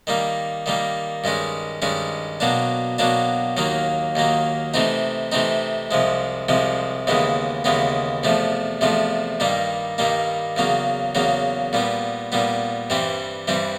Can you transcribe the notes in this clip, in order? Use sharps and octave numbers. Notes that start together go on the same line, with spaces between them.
D#3 G3 A#3
D#3 G3 A#3
G2 D#3 G#3 C#4
G2 D#3 G#3 C#4
B2 F#3 A#3 D4
B2 F#3 A#3 D4
D#2 D#3 F#3 A#3
D#2 D#3 F#3 A#3
C3 E3 A3 C4 D#4
C3 E3 A3 C4 D#4
C2 C3 F3 G#3
C2 C3 F3 G#3
D#2 C#3 E3 G#3 B3
D#2 C#3 E3 G#3 B3
E2 C3 F3 A3
E2 C3 F3 A3
G2 D#3 G3 A#3
G2 D#3 G3 A#3
E2 C#3 F#3 A#3
E2 C#3 F#3 A#3
A#2 G3 B3
A#2 G3 B3
G2 E3 G3 C4
G2 E3 G3 C4